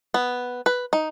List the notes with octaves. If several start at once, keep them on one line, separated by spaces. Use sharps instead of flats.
B3
B4
D#4